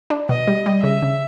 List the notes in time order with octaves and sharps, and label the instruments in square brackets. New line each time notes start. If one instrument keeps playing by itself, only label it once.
[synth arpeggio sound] D4
[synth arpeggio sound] B2 [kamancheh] D#5
[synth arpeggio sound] G3
G3
[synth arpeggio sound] C#3 [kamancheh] E5
[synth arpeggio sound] C#3